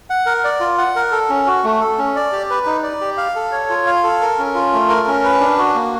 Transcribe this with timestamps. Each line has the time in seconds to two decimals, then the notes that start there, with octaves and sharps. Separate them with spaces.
0.10 F#5
0.26 A#4
0.44 D5
0.60 F4
0.78 F#5
0.96 A#4
1.12 A4
1.29 C#4
1.47 F#4
1.64 A3
1.81 A4
1.98 C#4
2.16 D5
2.32 G4
2.50 B4
2.66 D#4
2.83 D5
3.01 G4
3.17 F5
3.35 A4
3.52 C#5
3.69 F4
3.87 F5
4.03 A4
4.21 A#4
4.39 C#4
4.55 F4
4.73 A3
4.89 A#4
5.07 C#4
5.24 B4
5.40 D4
5.59 F#4
5.75 A#3